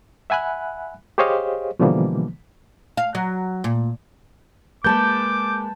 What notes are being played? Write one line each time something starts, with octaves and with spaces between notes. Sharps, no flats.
E5 F#5 G#5 B5 F#6
G4 G#4 C5 C#5 D#5 F5
B2 D3 E3 F3 G3 A#3
F5
F#3
A#2
G#3 A#3 B4 A5 B5 D6 G6